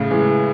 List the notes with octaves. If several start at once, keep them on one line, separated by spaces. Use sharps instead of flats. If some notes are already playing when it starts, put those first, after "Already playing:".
Already playing: A2 C#3
E3 G#3